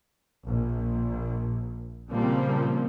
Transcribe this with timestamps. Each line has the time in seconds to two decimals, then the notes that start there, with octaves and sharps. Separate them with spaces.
0.46 A#1
2.09 A#2 C#3 F3 G3 A#3 C4